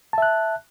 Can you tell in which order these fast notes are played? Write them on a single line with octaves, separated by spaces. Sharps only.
A5 E5 F#6